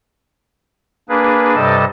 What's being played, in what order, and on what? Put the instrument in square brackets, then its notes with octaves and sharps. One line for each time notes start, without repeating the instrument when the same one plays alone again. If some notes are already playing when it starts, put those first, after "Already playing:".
[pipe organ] A#3 D4 G#4 B4
G2 C3 G3 A4 D#5 A5